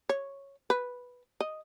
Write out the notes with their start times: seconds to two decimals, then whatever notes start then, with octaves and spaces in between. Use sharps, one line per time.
0.09 C#5
0.70 B4
1.40 D#5